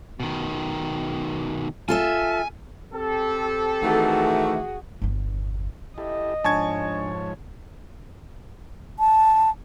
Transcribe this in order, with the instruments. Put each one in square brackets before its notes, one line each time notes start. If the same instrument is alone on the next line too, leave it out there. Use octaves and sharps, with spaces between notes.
[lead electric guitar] B2 D#3
[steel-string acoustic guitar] F4 A4 E5 [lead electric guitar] G#5
[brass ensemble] C4 G4 A4
[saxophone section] D#3 E3 A3 [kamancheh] F#4 G#4
[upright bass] G1 E2
[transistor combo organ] E4 G4 A4 [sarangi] D#5
[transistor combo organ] G#2 F3 C#5 [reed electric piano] D4 G#5 [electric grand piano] A5 C#6 G#6
[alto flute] A5